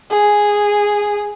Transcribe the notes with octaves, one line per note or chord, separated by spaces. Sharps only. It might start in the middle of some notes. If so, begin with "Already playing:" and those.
G#4